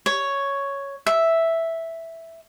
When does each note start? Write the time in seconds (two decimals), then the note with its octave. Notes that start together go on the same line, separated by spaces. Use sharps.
0.06 C#5
1.06 E5